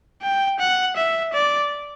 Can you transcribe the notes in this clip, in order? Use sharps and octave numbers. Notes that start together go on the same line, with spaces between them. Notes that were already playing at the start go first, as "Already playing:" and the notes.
G5
F#5
E5
D5